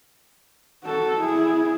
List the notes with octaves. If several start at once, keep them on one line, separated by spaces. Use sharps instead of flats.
F#4 A4
E4 G#4